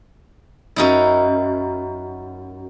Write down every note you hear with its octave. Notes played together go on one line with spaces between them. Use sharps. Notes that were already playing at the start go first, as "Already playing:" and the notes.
F#2 D#4 E4